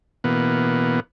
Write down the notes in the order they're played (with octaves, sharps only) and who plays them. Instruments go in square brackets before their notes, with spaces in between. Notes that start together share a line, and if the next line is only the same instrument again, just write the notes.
[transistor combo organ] B2 E3 A#3 B3